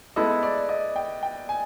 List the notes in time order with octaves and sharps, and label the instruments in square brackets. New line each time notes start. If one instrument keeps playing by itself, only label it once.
[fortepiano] G#3 B3 E4 A4 [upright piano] D#5
[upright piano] D5
D#5
G5
G5
G#5